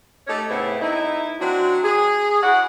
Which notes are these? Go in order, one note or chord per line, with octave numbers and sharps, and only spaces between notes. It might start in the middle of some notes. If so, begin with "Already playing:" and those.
A3 D#4 G4 A4 C#5
A2 C#3 B3 C4 E4
D#4 E4
F#3 C4 D4 F#4
G#4
E4 F#4 D5 F#5